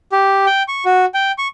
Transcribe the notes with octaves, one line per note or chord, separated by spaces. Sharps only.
G4
G5
C#6
F#4
G5
C#6